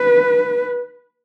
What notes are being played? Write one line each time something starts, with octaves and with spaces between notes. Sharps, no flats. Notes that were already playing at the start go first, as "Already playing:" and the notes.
Already playing: B4